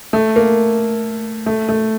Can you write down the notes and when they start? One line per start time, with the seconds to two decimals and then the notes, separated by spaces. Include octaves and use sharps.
0.13 A3
0.36 A#3
1.46 A3
1.69 A3